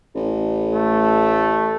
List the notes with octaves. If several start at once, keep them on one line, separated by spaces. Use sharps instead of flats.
A1
A3